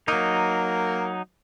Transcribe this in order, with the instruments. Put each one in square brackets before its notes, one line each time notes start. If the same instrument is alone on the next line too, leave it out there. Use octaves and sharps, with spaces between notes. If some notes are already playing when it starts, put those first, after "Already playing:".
[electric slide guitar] F#3 D#4 [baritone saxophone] A#3